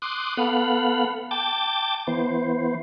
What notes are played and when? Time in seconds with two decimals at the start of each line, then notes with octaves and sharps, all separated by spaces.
0.02 C6 D6 D#6 F#6
0.37 B3 A4 F5 F#5 B5
1.31 G5 A5 D6 A6
2.07 E3 B3 C5